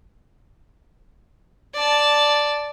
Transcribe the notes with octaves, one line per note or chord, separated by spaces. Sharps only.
D5 A5